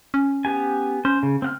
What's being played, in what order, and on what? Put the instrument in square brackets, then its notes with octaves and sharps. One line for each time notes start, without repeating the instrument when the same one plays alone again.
[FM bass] C#4
[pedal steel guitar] B3 G4 G#5
[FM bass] C#4 [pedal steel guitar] C5
[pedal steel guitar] C#3
C4 F#5 F6